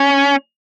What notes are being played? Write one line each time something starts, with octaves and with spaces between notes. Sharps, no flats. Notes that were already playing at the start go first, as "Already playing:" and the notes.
Already playing: C#4